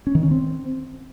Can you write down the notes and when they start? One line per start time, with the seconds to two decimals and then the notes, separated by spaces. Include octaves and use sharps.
0.07 C#4
0.15 D#3
0.23 C#4
0.31 C4